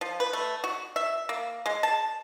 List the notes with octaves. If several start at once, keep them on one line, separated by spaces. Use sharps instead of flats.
F3
B4
A3
F#4
E5
A#3
G#3
A5